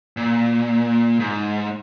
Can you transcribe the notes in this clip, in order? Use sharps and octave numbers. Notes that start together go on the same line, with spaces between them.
A#2
G#2